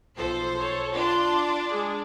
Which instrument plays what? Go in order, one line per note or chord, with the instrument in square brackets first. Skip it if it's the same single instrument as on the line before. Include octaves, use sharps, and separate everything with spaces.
[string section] B1 C5 [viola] F3 A4
[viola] A4 C#5
[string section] D4 [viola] F4 C6
[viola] G#3 G#4